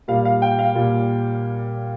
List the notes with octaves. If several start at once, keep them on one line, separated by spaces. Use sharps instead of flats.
A#2 G3 F5
F5
G5
F5
A#2 G3